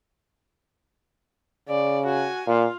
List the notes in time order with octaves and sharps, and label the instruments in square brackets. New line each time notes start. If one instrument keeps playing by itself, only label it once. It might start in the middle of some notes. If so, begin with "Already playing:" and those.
[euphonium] C#3 [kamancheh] D5
[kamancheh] F#4 G#5
[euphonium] A#2 [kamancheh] F4 F5